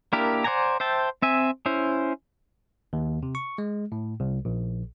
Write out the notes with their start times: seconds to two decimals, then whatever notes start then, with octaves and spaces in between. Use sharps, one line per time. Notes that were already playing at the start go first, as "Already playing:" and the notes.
0.13 A#3 D4 E4 G4 A#4
0.44 C5 D5 F#5 G#5 A#5
0.80 C5 E5 G5 A5
1.22 C4 E5 G#5
1.66 C#4 E4 C5
2.93 D#2
3.23 C3
3.35 C#6
3.58 G#3
3.92 A2
4.20 C2
4.45 A#1